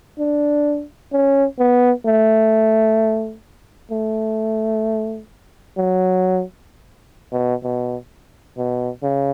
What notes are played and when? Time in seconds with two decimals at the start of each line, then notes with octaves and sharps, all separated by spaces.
0.19 D4
1.12 C#4
1.59 B3
2.06 A3
3.91 A3
5.77 F#3
7.33 B2
7.64 B2
8.57 B2
9.03 C#3